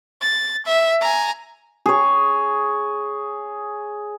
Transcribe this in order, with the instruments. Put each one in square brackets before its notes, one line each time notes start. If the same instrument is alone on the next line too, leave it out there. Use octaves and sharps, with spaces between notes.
[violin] A6
E5
G#5 A#5
[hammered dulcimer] G#4 C#5